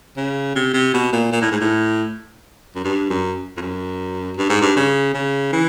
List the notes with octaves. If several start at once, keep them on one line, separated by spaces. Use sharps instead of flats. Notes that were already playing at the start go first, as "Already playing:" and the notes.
C#3
C3
C3
B2
A#2
A#2
A2
G#2
A2
F#2
G2
F#2
F2
F#2
G2
G#2
G2
C#3
C#3
E3